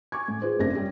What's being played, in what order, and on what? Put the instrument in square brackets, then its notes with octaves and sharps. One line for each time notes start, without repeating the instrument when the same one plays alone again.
[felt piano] G#5 C#6 D6 G#6
A2
F4 G#4 B4 C5
F#1 C3 A3 D4 G4 A#6
G3 C#4 G4